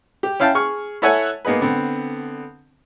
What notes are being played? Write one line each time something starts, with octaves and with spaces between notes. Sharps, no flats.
G4
C#4 E4 F5 G5 A5
G#4 C#6 F6
E4 A4 C#5 E5 F#5 G#5
A#3 B3 D#4 G#4 B4
D3 B3 C4